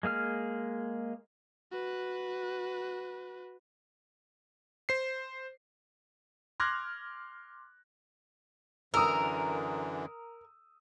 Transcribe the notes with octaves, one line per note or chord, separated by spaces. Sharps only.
G#3 A#3 G#4 F6
F#4 B4
C5 C7
C6 D6 F6 F#6 G#6 A#6
F#2 D3 E3 A#4 D#6 E6